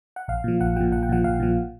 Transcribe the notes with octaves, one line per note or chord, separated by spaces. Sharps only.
F#5
A#1 F5
A#2 F3
A#1 F#5
A#2 F3 G5
A#1 F#5
G5
A#2 F3 F#5
A#1 F5
A#2 F3